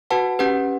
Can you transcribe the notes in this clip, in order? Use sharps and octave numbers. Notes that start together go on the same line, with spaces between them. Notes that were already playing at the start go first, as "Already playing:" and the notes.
F#4 B4 F#5 A5
C#4 G4 B4 F#5